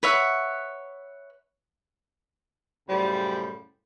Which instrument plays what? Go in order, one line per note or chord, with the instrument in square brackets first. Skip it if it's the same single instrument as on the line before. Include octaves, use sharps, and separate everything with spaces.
[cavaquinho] B4 C#5 E5 F#5
[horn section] F#2 A2 C#3 G3 C5 B5